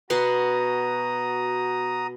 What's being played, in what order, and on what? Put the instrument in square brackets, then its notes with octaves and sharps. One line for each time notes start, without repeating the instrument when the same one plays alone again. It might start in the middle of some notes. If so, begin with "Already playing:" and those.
[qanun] B2 B3 C6 [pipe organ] F#4 A#5 D#6